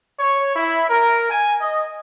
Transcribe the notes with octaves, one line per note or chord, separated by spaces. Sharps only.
C#5
E4
A#4
G#5
D#5